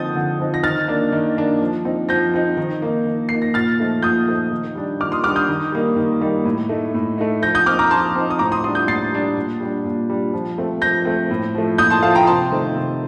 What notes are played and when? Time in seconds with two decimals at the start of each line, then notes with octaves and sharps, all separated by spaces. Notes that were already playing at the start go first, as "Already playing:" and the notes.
Already playing: D3 F3 C4 D#4 D#6 G6 A6
0.15 D3
0.40 F3 C4 D#4
0.54 A#6
0.63 D#3 F6 A6
0.88 A#3 D4
1.12 D#3
1.37 A#3 D4
1.61 F3
1.85 C4 D#4
2.09 F3 G6 A#6
2.34 C4 D#4
2.57 D#3
2.82 A#3 D#4
3.06 D#3
3.29 A#3 D#4 C7
3.42 A#6
3.54 A#2 F6 A6
3.79 F3 A3 D#4
4.03 A#2 D#6 G6
4.28 F3 A3 D#4
4.51 D#3
4.75 G3 D4
5.00 D#3 D6 F6
5.12 C6 D#6
5.24 G3 D4 D6 F6
5.36 D#6 G6
5.49 D#3
5.72 G3 A#3 D#4
5.96 D#3
6.21 G3 A#3 D#4
6.45 A2
6.69 A3 D#4
6.94 A2
7.18 A3 D#4
7.42 F3 G6 A#6
7.55 D#6 G6
7.66 C4 D6 F6
7.70 D#4
7.79 A#5 D6
7.91 F3 A5 C6
8.16 C4 D#4
8.30 D#6
8.39 A2 A#5 D6
8.52 C6 D#6
8.64 G3 D4 C6 D#6
8.75 D#6 G6
8.87 A2 A6 C7
9.13 G3 D4
9.37 A#2
9.60 G3 D4
9.85 A#2
10.10 G3 D4
10.33 F3
10.58 A3 C4
10.82 F3 G6 A#6
11.05 A3 C4
11.31 A2
11.54 F3 A3
11.78 A2 D#6 G6
11.90 A5 C6
12.02 F3 A3 F5 A5
12.15 G5 A#5
12.27 C3 A5 C6
12.52 D#3 A3 C4
12.76 C3